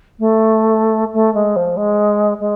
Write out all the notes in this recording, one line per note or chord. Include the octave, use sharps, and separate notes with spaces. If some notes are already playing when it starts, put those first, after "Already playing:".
A3
A3
G#3
F3
G#3
G#3